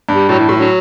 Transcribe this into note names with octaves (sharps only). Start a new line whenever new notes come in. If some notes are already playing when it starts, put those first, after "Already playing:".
G2
G3
A2 F#3
E3
A2 F#3
E3
D3 F#3